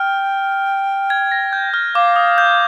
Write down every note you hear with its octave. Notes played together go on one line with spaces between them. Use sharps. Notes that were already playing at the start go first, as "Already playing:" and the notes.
Already playing: G5 F6
G#6
A#6
G6
F6
F5 D6
D#6
G6